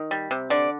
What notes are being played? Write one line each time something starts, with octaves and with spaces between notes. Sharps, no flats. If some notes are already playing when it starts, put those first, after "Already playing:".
Already playing: D#3
G3
C3
D3 D5